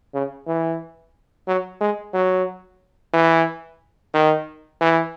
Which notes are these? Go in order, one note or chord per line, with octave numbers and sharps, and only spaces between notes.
C#3
E3
F#3
G#3
F#3
E3
D#3
E3